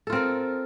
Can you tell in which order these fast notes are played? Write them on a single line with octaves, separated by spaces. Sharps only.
A4 F4 C4 A#4